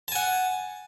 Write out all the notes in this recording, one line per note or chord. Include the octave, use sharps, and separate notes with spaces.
F#5 G#5 A5